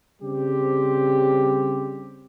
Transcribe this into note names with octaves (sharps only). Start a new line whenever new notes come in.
C#3 G3 C4 G4